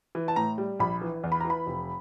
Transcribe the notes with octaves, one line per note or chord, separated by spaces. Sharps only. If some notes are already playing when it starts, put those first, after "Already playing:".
E3
A5
A2 A#5
G3
A#1 B5
E3
E2
B5
A#5
E3
B5
F1